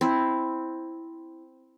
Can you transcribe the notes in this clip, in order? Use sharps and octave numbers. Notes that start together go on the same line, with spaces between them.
C4 E4